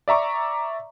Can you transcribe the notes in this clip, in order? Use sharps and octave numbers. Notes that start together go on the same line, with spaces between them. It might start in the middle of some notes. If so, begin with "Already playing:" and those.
D5 E5 A#5 C#6 D6